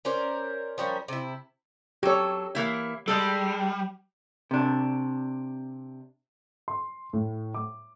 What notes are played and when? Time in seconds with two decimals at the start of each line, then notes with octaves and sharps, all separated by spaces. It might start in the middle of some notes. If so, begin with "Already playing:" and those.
0.05 C#4 A#4 C5 D5
0.78 F3 G3 C#4 A#4
1.08 C3 E4
2.03 F#3 G4 A4 C#5
2.55 E3 A#3 E4
3.08 G3 G#3 G#4 A4
4.51 C3 D4
6.68 C6
7.13 A2
7.54 D6